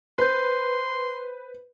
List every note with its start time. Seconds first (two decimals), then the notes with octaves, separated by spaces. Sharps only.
0.18 B4 C5 C6 G6